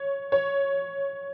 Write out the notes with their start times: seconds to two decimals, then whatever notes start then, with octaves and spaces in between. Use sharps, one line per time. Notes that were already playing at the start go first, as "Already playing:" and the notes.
Already playing: C#5
0.32 C#5